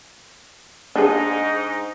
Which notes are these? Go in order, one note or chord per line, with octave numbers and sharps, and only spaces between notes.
G#2 D4 D#4 G#4